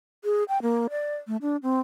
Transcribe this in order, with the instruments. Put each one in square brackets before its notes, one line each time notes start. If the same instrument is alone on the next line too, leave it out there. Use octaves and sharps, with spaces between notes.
[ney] G#4
G5
A#3
D5
A3
D4
C4